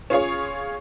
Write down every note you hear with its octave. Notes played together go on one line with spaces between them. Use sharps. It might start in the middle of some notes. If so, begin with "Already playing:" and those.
C#4 F4 G#4 C#5